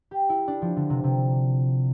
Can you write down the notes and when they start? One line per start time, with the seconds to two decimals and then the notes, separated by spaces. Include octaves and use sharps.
0.11 G4
0.29 E4
0.48 D4
0.62 F3
0.76 D3
0.90 C3
1.04 C3